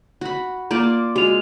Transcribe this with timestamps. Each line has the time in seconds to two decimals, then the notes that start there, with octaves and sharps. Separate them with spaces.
0.21 F#4 B5
0.71 A#3 F4 D5
1.16 G#3 F4 F#4 F7